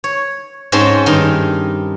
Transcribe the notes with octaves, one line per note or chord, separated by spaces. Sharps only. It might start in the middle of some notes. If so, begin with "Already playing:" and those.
C#5
G#2 G#3 C4 C#4 A5 C6
G2 D#3 D#4 C6